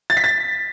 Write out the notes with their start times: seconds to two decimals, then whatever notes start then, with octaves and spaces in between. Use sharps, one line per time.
0.10 A6
0.17 B6
0.24 A6